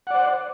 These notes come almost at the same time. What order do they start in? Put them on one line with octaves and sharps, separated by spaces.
F#5 D5 C5